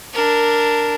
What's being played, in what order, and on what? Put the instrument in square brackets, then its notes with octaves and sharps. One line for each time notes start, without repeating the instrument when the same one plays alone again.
[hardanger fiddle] D4 A#4